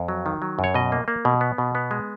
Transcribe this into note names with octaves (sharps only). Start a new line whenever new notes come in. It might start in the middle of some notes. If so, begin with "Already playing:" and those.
Already playing: F2
F#3
D#3
F#3
F#2
C#5
B2 D#5
A#3
A#3
B2
B3
B2
B3
G#3